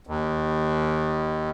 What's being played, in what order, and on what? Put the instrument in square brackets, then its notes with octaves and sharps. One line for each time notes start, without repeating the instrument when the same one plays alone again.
[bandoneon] D#2